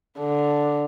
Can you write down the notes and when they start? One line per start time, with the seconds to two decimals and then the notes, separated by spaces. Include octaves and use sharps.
0.18 D3